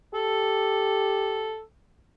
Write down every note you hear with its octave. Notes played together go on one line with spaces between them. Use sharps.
G4 A4